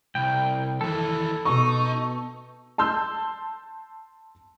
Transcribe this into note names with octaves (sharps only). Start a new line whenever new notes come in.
C2 G5
D#2 E3 A4
B2 D#4 C#6
A5 C6 E6 G6